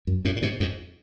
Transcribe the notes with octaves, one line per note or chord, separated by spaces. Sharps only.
F#2
F#2 A2
A2
G#2 B2
F2 G#2